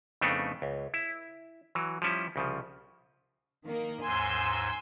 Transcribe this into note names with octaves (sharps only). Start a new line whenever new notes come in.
F2 C#3 A3 B3 D4 D#4
C#2
E4
E3 F#3
F3 G3 C#4 E4
C2 C#3 F3
D#3 A#3
D#2 G#2 G#5 C6 E6 G#6